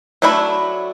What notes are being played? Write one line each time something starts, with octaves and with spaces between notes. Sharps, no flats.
F#3 A3 D4 E4 B5